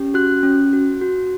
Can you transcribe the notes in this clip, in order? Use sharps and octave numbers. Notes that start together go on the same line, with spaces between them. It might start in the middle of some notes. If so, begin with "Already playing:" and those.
Already playing: C#4 G4
F#4 F#6
C#4
F#4
F#4